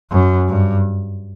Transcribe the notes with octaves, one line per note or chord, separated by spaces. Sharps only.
F#2
G2